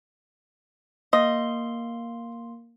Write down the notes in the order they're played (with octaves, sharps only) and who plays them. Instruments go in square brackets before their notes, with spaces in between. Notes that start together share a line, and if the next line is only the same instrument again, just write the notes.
[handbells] A#3 C6 [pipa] D#5